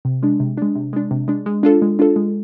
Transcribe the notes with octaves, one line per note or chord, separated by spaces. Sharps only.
C3
G#3 D4
C3
G#3 D4
C3
G#3 D4
C3
G#3 D4
G#3
D4 F4 A4
G#3
D4 F4 A4
G#3